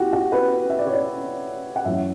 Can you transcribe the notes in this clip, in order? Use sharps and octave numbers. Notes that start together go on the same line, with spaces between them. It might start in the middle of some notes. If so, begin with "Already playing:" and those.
Already playing: E4 F#4 G4
F#4
B4
E5
D5
C#5
D5
F#5
F#2 E3 A3 E5